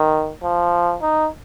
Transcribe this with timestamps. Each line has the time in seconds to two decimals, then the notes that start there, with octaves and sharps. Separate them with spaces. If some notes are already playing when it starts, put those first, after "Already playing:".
Already playing: D#3
0.43 F3
1.02 D#4